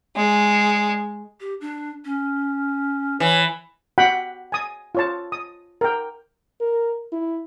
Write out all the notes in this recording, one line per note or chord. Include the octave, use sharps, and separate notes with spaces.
G#3
G4
D4
C#4
E3 C#5
F#4 F#5 G5 B5
G#5 D#6
F4 C#5 A5
D#6
A#4 G5
A#4
E4